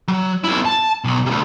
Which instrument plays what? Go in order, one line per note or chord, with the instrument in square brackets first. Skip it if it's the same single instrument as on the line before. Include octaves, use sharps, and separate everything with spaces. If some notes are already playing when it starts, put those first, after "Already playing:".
[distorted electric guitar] F#3
B1 E4
A5
B1
D2 C3